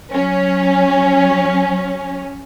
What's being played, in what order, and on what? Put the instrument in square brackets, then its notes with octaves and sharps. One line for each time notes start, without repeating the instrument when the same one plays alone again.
[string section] F#3 C#4